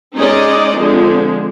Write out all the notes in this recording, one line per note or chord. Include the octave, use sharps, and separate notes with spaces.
G#3 C#4 D#4 D5 D#5
D3 F3 G#3 C4